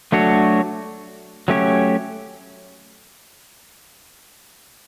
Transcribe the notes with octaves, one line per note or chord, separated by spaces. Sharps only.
F#3 A3 D4 F#4 C#5
F#3 A3 C#4 G4 C#5